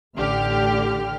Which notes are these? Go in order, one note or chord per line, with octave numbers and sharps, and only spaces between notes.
A1 D3 G4 F6